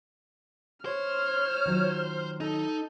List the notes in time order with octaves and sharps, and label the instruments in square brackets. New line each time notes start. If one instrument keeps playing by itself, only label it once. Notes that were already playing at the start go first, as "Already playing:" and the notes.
[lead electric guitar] C5 [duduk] C#5 [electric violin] F6
[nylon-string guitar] D#3 F#3 F4
[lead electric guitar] D#4 [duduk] A4